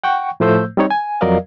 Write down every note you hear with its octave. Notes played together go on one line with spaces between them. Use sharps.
F#5 G5 C#6
A2 F3 A3 C5 E6 G6
G3 C4 D#4 C#5 D#5
G#5
F2 F#3 A#4 D5 D#5 F5